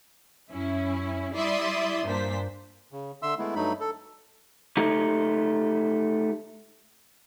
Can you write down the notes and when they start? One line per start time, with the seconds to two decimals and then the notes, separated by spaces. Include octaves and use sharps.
0.51 F#2 C#4 E4
1.34 G3 E4 D5 E5 C6 D#6
2.05 G2 A#2 D4 C5 B6
2.92 C#3
3.22 D3 E5 C6 E6
3.39 G#3 A3 B3 E4
3.55 G2 F#3 A3 D#4 B5
3.80 A4
4.77 A3 D#4 G4